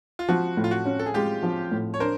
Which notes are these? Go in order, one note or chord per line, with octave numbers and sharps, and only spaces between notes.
F4
F3 F#4
A2
F4
F#4
C#4
A4
G#4
G#3 F4 G4
F3
A2
C#5
D4 A#4 C5